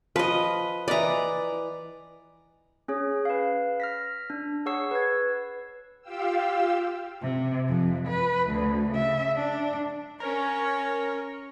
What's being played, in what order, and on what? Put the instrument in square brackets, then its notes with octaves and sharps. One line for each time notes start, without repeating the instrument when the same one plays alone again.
[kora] F3 [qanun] B4 D#5
[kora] E3 B4 D#5 [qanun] D5 A#5
[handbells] C#4 G#4 C#5
B4 F5
F6 A#6 B6
D4
G#4 C#5 F#5 C#6 E6 C7
B4 G#6
[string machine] F4 G4 F5 G5 E6
[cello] C3
F2
B4
D2
C#3 E5
D4
[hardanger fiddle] C#4 C#5 [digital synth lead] A#4